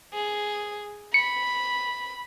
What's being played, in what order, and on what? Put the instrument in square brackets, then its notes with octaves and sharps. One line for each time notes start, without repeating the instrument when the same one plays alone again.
[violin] G#4
[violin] B5 [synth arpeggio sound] C#7